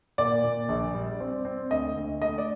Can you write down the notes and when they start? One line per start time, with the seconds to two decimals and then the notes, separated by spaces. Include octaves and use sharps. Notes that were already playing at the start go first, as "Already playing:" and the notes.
0.18 A#2 D5
0.44 A#2
0.69 A#1
0.94 G3
1.20 C4
1.45 C4
1.71 D2 D#5
1.96 D2
2.21 A3 D#5
2.38 D5